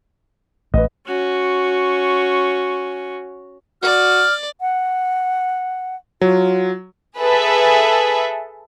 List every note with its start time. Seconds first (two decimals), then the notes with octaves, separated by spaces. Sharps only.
0.74 A1 A3 B4 D#5
1.07 C#4 F#4
3.83 F#4 D5 F6
4.61 F#5
6.21 F#3 F4
7.19 G#4 A4 B4 E5